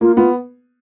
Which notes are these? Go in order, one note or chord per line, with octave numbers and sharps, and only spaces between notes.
A#3 F4
B3 F4